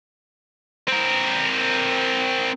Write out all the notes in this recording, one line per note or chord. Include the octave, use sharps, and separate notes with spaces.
C4 A#4